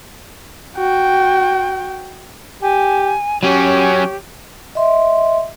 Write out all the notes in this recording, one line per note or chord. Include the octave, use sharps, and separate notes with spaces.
F#4 G5
G4 G#5
F#3 C#4 G4 C#5
D#5 E5 C6